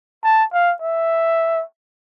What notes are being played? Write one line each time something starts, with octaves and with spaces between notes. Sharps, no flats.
A5
F5
E5